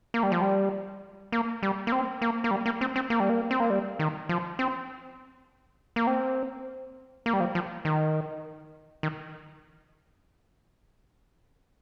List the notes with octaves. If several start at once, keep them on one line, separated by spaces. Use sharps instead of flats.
A#3
G3
F3
G3
A#3
G3
A#3
C4
A#3
A#3
G3
A#3
C4
C4
A#3
G3
A#3
C4
A#3
G3
D#3
F3
C4
A#3
C4
A#3
G3
F3
F3
D#3
D#3